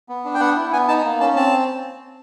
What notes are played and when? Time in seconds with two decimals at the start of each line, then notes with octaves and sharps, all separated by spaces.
0.09 B3
0.25 D4
0.35 G5
0.40 B3 F#5
0.56 E4
0.72 B3 G#5
0.88 D#4 A5
1.05 A#3
1.20 C#4 A5
1.36 C4 A5